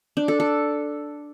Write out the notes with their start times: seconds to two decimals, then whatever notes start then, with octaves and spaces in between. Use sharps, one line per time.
0.17 D4
0.28 A4
0.40 A4